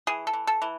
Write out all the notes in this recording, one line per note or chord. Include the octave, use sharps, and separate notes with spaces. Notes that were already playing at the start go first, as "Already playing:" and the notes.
E3 G#4
A4
E3
A4
E3